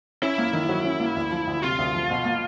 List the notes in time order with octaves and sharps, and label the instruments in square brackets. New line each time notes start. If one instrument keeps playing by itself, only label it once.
[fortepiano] C#4 [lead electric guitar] E4
[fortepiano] A#3
D#3
F#3
C#4
A#3
D2
F3
D2
[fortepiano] C3 [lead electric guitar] F4
[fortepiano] D2
F3
B2
A#3